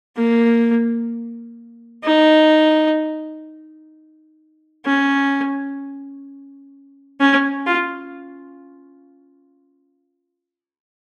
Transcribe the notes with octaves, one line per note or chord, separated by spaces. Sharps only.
A#3
D#4
C#4
C#4
F4